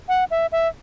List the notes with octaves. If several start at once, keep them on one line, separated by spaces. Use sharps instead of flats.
F#5
E5
E5